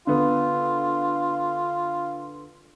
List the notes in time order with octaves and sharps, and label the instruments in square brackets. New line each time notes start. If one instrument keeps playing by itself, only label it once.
[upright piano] D3 B3 [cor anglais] F4